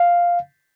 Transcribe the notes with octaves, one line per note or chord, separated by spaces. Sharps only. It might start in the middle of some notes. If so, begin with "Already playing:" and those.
Already playing: F5